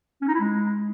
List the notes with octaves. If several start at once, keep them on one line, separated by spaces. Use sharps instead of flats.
C#4
D#4
E4
G#3